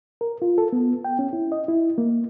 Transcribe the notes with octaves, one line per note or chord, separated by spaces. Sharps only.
A#4
F4
A4
B3
G5
C#4
E4
D#5
E4
A#3